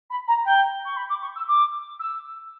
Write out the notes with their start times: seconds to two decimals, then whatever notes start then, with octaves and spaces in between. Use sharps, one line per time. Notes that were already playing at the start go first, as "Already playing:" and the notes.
0.10 B5
0.27 A#5
0.45 G5
0.85 C#6
0.96 B5
1.09 D6
1.21 C#6
1.35 E6
1.47 D6
1.99 E6